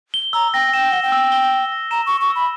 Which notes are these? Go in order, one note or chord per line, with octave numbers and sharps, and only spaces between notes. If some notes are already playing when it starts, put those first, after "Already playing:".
G7
A#5 E6
G5 A#6
G5 E7
F#5 G7
G5
E6
G7
E6
A#6
A#5 E7
C#6 G7
C#6
E6
B5